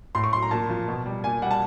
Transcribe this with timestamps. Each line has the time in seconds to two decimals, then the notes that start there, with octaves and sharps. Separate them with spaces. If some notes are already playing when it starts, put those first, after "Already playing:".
0.15 A2 C6
0.24 C#6
0.33 F#3 C6
0.42 A#5
0.51 A#2 A5
0.70 F3
0.88 B2
1.06 G3
1.24 A#2 G#5
1.42 G3 F#5
1.51 A5